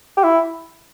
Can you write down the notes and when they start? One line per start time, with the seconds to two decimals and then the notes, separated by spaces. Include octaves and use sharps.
0.17 G4
0.24 E4